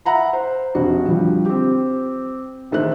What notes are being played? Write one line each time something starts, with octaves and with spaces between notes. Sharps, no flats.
E5 F#5 A#5 B5
C5
F1 A#1 F#4
D3 F3 G3
C4 G4
A1 D#3 A3 C5 F#6